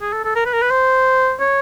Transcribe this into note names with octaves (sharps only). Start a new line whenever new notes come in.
G#4
A4
A4
A#4
B4
A#4
B4
C5
C#5